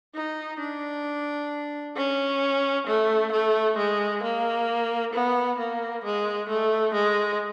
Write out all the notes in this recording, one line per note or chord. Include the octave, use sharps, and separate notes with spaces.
D#4
D4
C#4
A3
A3
G#3
A#3
B3
A#3
G#3
A3
G#3